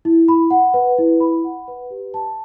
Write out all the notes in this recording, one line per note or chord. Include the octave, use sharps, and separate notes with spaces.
E4
B5
F#5
B4
E4
B5
F#5
B4
G4
A5